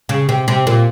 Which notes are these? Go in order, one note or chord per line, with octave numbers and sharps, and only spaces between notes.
C#3
C3
C3
A#2